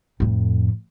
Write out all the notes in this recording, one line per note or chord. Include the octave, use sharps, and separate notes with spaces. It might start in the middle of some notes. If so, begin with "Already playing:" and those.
F2 A2